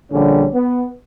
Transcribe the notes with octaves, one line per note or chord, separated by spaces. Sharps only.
A#1 D3 G3 C#4
B3